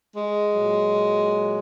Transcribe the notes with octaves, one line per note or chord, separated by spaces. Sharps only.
G#3
A#2 F#3